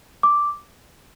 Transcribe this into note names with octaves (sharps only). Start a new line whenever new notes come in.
D6